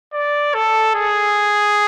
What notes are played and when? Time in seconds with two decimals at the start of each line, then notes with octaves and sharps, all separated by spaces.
0.13 D5
0.54 A4
0.95 G#4